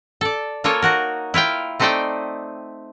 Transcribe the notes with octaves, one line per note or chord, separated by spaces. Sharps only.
A4 D5
A#3 F4 A4 A#4 C#5 G#5
D#4 F#4 A#4
E4 F4 F5 G5
A3 C4 D#4 C5 D5 G5